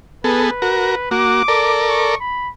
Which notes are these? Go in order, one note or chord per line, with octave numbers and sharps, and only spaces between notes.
B3 G#4 A4 B4
F#4 A#4
A#3 F#4 D6
A4 A#4 D5
C#6
B5